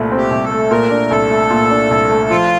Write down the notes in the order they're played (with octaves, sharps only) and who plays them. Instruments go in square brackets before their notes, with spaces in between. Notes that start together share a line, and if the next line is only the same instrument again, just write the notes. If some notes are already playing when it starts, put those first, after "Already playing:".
Already playing: [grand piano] C2 A#2 A3
C4
[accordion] G4
[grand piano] C2
[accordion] A4
[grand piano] A3
[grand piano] A#2 [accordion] A#4
[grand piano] D4
[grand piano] C2 [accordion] A4
[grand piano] A3
A#2
D4
C2
A3
[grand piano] F3 [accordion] F4